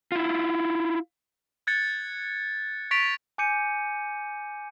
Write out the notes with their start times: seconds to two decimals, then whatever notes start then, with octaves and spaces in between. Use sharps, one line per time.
0.12 E4 F4
1.67 F#6 G#6 A6 C#7
2.91 C#6 A6 B6 D7 F7
3.38 G#5 D6 G6 C#7 D#7